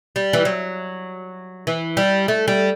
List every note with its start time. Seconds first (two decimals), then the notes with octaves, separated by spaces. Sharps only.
0.16 G3
0.33 E3
0.45 F#3
1.67 E3
1.97 G3
2.28 A3
2.48 G3